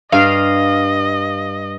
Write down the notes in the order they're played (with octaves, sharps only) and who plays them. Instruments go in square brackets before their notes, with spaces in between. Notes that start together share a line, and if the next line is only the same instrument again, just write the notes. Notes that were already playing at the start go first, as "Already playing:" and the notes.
[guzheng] G2 D5 [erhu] D#5 [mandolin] F5